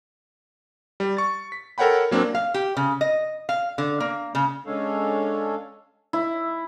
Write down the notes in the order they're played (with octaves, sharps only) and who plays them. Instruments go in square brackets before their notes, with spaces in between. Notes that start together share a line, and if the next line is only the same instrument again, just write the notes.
[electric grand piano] G3
C#6 A6
B6
A4 A#4 C#5 F#5 G5 B5
F#3 A#3 C4 D4
[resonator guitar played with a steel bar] F5
G4
C#3
D#5
F5
D3
A#3
C#3
[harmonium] G#3 C#4 D4 A4 C#5 F5
[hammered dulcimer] E4